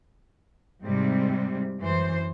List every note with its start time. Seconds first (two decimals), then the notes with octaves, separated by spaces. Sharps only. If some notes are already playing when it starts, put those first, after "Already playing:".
0.84 G#2 C3 G3 C4
1.80 F#2 E3 C5